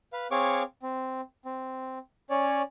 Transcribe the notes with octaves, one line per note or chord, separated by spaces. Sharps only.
B4 F5
C4 G#4 C#5 F5 C#6 D6
C4
C4
C#4 C#5 D5